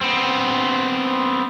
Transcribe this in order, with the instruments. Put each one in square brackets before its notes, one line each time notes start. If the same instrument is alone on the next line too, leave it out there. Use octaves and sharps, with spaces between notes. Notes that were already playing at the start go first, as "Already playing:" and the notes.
[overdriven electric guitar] B3 C4